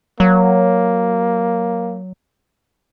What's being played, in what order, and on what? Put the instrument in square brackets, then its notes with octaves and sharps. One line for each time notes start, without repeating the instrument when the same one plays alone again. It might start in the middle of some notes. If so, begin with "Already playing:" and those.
[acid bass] F#3 [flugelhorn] A#3